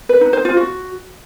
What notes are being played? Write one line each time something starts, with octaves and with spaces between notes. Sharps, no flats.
B4
D#4
C5
F4
F#4